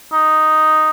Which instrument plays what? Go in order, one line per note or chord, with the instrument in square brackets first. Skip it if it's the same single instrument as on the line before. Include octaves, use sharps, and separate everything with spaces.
[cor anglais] D#4